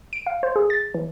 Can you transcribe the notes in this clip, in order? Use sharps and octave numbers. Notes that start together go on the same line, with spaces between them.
D7
F5
C5
G#4
A6
E3